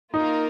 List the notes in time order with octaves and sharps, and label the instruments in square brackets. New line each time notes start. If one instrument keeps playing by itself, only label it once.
[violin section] A#3 F4 A#4 [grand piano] D#4